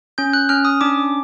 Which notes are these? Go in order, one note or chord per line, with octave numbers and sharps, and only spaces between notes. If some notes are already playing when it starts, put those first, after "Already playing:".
C#4 G6
F#6
C#4 F6
D#6
D4 D6